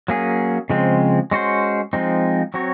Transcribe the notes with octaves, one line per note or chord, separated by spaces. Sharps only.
F#3 A#3 C#4 G#4
C#3 F3 G#3 C4
G#3 C#4 F#4 C5
F3 G#3 C4 D#4
F#3 C4 F#4 C#5